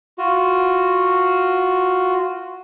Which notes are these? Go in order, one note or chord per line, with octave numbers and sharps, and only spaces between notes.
F4 F#4